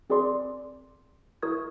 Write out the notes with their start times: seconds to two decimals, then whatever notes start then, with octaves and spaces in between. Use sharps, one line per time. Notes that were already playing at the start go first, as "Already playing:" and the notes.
0.10 C4 G#4 A#4 D5 C6 D6
1.43 E4 A#4 C#6 D#6 G#6